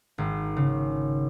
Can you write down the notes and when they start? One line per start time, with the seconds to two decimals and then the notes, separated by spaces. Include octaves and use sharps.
0.18 G#1
0.57 C#3